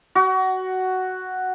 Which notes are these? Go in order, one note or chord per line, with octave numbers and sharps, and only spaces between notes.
F#4